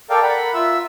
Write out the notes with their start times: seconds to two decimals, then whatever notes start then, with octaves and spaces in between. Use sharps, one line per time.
0.10 A4 A#4 D5 F5 G5
0.23 A#4 F#5 B5
0.54 F4 E5 E6